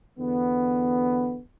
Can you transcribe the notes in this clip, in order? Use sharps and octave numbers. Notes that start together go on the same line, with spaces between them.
E2 D3 B3